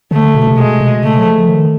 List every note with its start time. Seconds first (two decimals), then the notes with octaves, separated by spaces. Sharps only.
0.11 D3 A3
0.35 B2
0.47 C3
0.57 B2 G#3
0.74 C3
0.80 B2
1.03 C#3 A3
1.19 F#3
1.26 F3
1.48 D#3